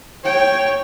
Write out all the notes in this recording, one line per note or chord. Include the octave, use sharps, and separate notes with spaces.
C#5 G5